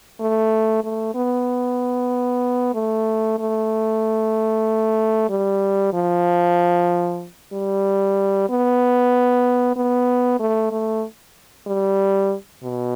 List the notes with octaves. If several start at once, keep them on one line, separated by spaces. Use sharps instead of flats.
A3
A3
B3
A3
A3
G3
F3
G3
B3
B3
A3
A3
G3
B2